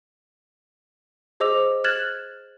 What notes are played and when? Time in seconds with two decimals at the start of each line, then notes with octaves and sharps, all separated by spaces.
1.40 G#4 C5 D#5 D6 E6 F7
1.84 F6 F#6 G#6 A6 E7 F#7